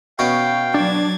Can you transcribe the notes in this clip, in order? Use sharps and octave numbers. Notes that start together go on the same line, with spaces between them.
B2 C#4 F5 G5
F#3 D4 G#6 A6